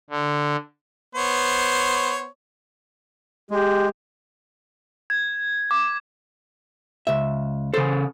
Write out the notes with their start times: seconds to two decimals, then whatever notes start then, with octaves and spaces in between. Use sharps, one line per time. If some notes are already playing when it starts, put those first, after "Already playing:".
0.10 D3
1.15 B3 C5 C#5
3.51 G#3 G4
5.10 G#6
5.71 D6
7.07 C#2 E5
7.74 C#3 A4 C5